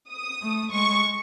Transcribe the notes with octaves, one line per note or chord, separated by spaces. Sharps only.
D#6
A3
G#3 C#6